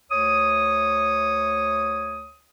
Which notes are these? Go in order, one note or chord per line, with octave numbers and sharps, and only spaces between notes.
D2 C#5 D#6